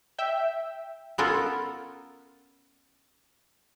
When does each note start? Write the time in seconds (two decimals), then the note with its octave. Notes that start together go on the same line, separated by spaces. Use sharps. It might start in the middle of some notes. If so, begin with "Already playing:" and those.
0.18 E5 G5
1.18 B3 C#4 F4 A4 A#4